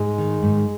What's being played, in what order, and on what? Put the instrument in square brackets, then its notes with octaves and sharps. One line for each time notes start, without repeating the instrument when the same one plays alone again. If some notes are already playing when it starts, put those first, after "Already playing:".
Already playing: [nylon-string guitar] G#2 [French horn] G#3
[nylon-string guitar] D#3
G#2